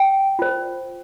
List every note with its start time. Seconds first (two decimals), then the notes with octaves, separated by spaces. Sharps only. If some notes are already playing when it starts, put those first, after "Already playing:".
Already playing: G5
0.39 F4 C5